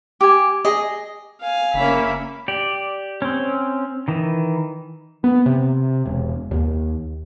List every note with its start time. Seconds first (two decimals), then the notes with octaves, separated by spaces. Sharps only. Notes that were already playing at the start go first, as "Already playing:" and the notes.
0.21 G4 G#5
0.65 G#4 D#5
1.41 F5 G#5
1.74 F#1 A#3 C#4 E5 B5
2.48 G4 D5
3.22 C4 C#4
4.08 D#3 E3
5.24 B3
5.46 C3
6.06 E1
6.51 D#2